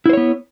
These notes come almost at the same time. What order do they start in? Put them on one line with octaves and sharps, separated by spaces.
E4 C5 C#5 B3